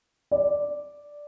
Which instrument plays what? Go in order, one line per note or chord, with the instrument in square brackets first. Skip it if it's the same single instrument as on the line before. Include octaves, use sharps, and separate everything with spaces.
[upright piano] D5